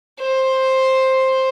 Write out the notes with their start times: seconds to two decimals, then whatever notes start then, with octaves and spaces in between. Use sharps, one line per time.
0.20 C5